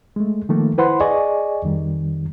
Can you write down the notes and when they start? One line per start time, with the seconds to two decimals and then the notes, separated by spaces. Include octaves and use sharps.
0.16 G#3 A3
0.49 D#3 F3 A3 A#3
0.78 E4 B4 C5 F#5 B5 C6
1.00 G#4 D5 D#5 G#5 C#6
1.63 F2 D#3 G3